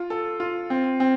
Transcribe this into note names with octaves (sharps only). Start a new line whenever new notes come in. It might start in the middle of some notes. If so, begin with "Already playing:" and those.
Already playing: F4
A4
F4
C4
C4